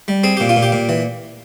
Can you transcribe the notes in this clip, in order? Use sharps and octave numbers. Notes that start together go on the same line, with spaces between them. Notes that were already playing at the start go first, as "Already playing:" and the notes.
G3
C4 G#4
A#2 G4
F4
A#2
G4
A#2
E3